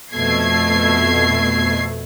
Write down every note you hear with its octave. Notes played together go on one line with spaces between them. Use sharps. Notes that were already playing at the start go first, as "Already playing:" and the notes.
F2 B2 A3 G#6 C7